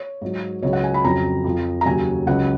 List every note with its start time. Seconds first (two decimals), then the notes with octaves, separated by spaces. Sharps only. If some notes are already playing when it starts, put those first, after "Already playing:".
Already playing: C#5
0.21 G#2 F#3
0.62 C#2 C#3 F#3 C#5
0.73 F#5
0.84 G#5
0.94 B5
1.04 F2 C#3 F#3 A#5
1.44 F2 F3
1.81 A#5
1.85 D#2 C#3 F#3 G#5
2.27 C#2 C#3 F#3 F#5